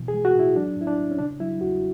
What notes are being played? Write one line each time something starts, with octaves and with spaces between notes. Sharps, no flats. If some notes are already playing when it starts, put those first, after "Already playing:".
Already playing: B2 E3
G#4
G#3
F#4
A2
E4
F#3 D4
A2
E4
D4
A2
C#4
C#3 D4
F#3 E4
E2 F#4